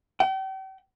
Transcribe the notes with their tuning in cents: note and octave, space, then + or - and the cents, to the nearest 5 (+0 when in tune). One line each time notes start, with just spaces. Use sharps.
G5 -40